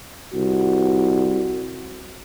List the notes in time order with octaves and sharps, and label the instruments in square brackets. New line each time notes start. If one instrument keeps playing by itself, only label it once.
[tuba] C2 [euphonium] F#4